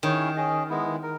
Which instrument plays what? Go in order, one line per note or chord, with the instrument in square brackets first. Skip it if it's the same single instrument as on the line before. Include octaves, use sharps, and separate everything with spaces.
[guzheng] D#3 [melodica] C#4 E4 G#4 C#5
[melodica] C#4 G#4 D#5
G#3 B3 E4
A#4